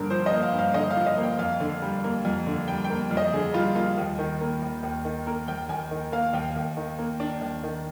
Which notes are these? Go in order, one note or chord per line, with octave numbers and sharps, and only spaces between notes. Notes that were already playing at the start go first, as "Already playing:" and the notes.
Already playing: G2 D3 F3 A#3 A#4
F3 C5
D#5
A#3
F5
G2
F5
D3 D#5
F5
F3
D#5
A#3
G5
F2 F5
D3
G3
A#3
F2
D3
G3 G5
G5
A#3
F2
D#5
D3 G#4
G3 F4
A#3 F4
D#2
D#3
A#3
D#2
D#2
D#3
A#3 A#4
D#2 G5
D#2 G#5
D#3
A#3 F5
D#2 G5
D#2
D#3
A#3
D4
D#2
D#3